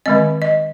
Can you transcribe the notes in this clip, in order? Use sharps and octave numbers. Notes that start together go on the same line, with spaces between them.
D#3 G#3 C4 D#5
D#5